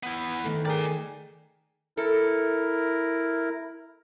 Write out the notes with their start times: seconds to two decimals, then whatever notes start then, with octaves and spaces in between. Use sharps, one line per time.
0.03 B3 E4
0.44 D#3 A3
0.65 G#4 A#4 D5 G5 G#5
1.97 E4 A4 A#4